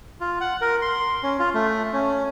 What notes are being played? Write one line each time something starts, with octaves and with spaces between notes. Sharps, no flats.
F4
F#5
A#4
C6
C#4
F4
A3
C#4